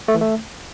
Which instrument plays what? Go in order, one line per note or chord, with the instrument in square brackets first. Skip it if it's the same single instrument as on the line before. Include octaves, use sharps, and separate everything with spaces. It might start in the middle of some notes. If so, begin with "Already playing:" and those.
[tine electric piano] A3
E3
A3